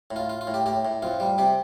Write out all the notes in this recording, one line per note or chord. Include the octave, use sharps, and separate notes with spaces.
A2
F4
F4
F4
A2
G4
A2 G4
A2
F2 F4
G3
C3 G4